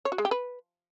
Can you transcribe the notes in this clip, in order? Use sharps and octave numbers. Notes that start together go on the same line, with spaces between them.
C#5
F#4
G#3
G4
B4